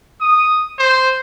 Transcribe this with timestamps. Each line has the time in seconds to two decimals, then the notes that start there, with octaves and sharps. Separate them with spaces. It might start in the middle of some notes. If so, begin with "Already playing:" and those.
0.21 D#6
0.78 C5